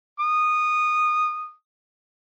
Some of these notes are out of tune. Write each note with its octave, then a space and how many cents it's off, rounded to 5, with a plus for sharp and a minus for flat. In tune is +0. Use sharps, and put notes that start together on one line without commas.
D#6 -15